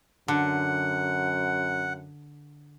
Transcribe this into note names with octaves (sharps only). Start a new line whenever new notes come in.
F#2 D3 F#5